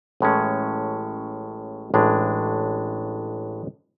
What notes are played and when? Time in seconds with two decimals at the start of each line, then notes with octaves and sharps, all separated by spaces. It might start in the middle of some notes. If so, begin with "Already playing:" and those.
0.21 A1 A2 G#3 C#4
1.94 A1 A2 G#3 D4